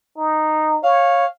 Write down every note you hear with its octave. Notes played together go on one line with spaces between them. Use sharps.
D#4
C#5 F5